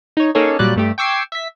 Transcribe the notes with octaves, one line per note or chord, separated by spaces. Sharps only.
D#4 C#5
A#3 C#4 D#4 G#4 A4 C#5
A#2 F#3 G3 D5 F#6
G2 A3 G4
G5 C#6 D6 E6 G#6 C7
E5 B6